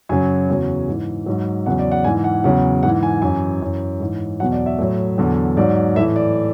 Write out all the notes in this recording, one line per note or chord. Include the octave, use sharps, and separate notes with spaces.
F#2 C#3 F#3 G#5
E2 C#3 F#3
G#2 E3
G#2 F#3
E2 C#3 F#3 F#5
D5
F#5
G#2 E3 G#5
F#5
E2 C#3 F#3 F#5
G#2 E3 F#5
G#5
F#2 E3 G#5
F#2 E3
G#2 E3
E2 B2 F#3 F#5
D5
E5
A2 F#3
E2 D3 F#3
G#2 F#3 D5
A2 E3 E5
D5